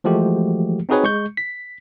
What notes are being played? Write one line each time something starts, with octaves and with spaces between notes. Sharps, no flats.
E3 F3 G#3 A3 F#4 G4
C4 D#4 F#4 G#4 B4 C#5
G#3 C#6 G6
B6